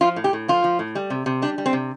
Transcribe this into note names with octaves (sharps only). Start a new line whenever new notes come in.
F3 F4
A2
G4
A2
F3 F4
F3
A2
G3
C3
C3
G3 D4
G3
C4
C3